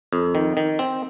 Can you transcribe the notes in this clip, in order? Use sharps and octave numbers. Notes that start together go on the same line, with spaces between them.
F2
D#3
D#3
C4